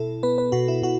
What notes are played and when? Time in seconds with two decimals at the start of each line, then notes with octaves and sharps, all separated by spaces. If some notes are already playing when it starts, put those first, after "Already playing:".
Already playing: B2 E4 A4
0.23 B3 B4
0.38 B4
0.52 B2 F#4
0.68 E4
0.82 B2 F#4